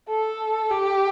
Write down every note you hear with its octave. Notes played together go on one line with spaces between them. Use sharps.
A4
G4